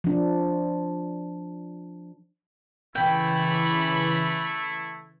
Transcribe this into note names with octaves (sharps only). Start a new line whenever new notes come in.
F3 D4
C#3 E3 A3 E4 G5 B5